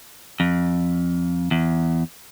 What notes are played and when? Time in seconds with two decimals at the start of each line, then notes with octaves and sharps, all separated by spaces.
0.40 F2
1.51 E2